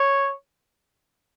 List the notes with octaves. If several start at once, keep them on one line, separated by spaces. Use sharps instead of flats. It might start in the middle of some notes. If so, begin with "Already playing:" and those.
Already playing: C#5